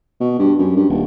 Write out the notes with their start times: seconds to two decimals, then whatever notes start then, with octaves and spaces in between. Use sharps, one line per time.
0.21 B2
0.39 G2
0.59 F#2
0.76 G2
0.89 D#1